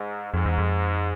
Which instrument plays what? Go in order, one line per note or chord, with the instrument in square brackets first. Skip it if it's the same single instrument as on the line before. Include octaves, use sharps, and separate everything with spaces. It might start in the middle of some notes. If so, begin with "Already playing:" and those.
Already playing: [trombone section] G#2
[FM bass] F2 [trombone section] G#2
[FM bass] E2
F2